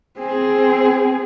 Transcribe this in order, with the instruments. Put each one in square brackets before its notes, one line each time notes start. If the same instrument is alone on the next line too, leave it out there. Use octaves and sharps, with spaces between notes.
[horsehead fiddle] C4 G#4